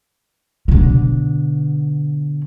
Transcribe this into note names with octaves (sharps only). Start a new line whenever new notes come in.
B2 D3